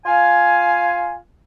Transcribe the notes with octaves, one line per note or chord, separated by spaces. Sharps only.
F4 F5 G#5